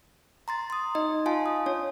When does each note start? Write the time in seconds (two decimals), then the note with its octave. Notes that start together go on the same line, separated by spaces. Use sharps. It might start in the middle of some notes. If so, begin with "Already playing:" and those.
0.48 A#5 C6 A6
0.70 C6 D#6
0.95 D#4 D#5
1.26 F4 F5 G#5 A5 C6
1.46 D#6
1.66 D4 C#5